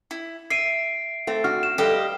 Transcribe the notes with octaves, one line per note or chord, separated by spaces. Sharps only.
E4
E5 C7 D7 D#7
A3 C4
D4 F#4 F6
E7
G3 G4 A4 B4 C5 D#5 F5